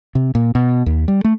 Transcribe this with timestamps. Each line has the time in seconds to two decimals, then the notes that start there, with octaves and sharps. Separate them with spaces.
0.15 C3
0.35 A#2
0.55 B2
0.86 D#2
1.08 G3
1.24 A3